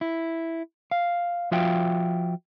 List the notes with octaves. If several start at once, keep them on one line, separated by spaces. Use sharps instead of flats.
E4
F5
F3 F4 F#4 E5 F5 G5